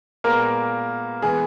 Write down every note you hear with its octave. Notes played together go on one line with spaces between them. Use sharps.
A#2 G#3 A#3 B3 A#4
E3 G#3 B3 G#4